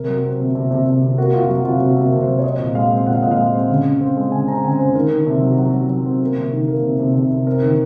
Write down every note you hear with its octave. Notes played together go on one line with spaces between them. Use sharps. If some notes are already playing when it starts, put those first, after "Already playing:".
Already playing: C3 A#4
F#3
C4
C3
C3
C3
C3
C3
A#3 F#4
C3 F4
F#3 F#4
C3 F4
C3 F#4
C3 A#4
C3
C5
F#3
C#5
C4 D#5
A#2
G#3 F5
C4
A#2 F#5
F5
A#2 D#5
F5
G#3
C4
C#3
C#3
C4
G#3
C#3 G#5
C4 A#5
C#3 G#5
C#3 C5
D#3 A#4
D#3
C3
F#3
F#3
F#3
F#3
C4
A#3
C3
D#3
A#3
C3
C3
C3
C3
C4 A#4
D#3